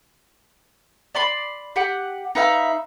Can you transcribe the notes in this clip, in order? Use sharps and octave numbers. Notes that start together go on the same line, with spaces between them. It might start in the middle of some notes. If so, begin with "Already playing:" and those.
D5 B5 C6
G4 F#5
D#4 B4 E5 F5